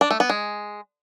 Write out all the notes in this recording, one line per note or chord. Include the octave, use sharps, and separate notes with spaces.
D4
A3
B3
G#3